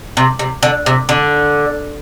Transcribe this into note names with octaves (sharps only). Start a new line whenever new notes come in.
C3
C3
D3
C3
D3